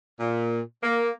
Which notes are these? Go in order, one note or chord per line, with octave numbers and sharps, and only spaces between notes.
A#2
A#3